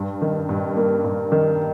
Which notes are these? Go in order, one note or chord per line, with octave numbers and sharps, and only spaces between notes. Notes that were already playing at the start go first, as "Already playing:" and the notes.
Already playing: G2
D#3
G2
A#3
G2
D#3